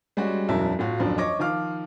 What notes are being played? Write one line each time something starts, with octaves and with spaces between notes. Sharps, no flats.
G3 G#3 C#4 F#4
E1 B1 F#2 E4 A5
A2 F4 F#4
D#1 F#2 F3 D4
C#5 D#5 C#6 D6 A#6
D#3 F3 F5 D6 F6